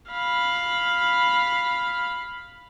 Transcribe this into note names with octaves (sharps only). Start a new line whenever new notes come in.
F5 B5